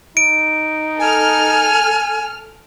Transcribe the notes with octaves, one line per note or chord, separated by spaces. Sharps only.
D#4 D7
A4 G#5 F6